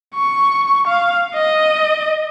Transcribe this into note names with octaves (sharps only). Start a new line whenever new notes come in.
C#6
F5
D#5